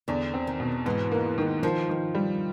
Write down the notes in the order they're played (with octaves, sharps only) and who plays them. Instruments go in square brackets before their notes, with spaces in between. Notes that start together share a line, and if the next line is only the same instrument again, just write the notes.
[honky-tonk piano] E2 [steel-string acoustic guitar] D3
[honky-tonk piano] C4
[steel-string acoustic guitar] D#3
[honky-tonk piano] B2
[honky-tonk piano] G#2 [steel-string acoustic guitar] E3
[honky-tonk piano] A#3
D#3
[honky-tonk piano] D#3 [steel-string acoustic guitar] F3
[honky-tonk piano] D#3
G3